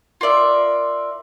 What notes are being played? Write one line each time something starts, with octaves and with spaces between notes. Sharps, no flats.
F4 A#4 D5 E5